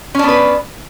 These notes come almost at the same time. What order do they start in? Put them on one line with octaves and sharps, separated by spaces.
C#4 D4 B3 B4